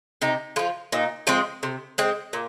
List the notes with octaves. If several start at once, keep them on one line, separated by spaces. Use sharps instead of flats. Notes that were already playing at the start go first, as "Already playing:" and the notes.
C3 D#4
F3 G#3 F4
A#2 D#4
F3 G#3 C4
C3
G#3 C4
A#2